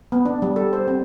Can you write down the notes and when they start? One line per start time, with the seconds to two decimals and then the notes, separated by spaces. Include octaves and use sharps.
0.12 B3
0.25 D4
0.42 G3
0.56 A4
0.73 C5
0.87 C4